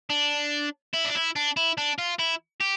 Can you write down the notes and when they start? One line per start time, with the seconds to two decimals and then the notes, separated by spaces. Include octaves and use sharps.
0.10 D4
0.94 E4
1.05 D4
1.15 E4
1.36 D4
1.57 E4
1.78 D4
1.98 F4
2.19 E4
2.61 G4